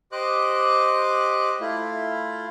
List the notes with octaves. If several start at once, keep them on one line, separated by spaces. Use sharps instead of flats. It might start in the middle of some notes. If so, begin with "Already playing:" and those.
G4 C5 D#5 D6 F#6
A3 E4 F4